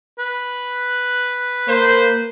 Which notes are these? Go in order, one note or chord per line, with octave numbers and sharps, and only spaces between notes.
B4
A#3 C5